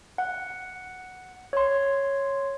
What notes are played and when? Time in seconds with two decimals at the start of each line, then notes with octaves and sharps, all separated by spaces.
0.18 F#5
1.53 C#5 C6